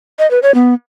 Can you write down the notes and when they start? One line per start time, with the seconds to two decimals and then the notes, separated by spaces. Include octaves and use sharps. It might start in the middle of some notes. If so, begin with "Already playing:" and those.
0.19 D#5
0.31 B4
0.43 C#5
0.54 B3